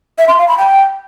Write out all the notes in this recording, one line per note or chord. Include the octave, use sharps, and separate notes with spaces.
E5
C6
F5
B5
G5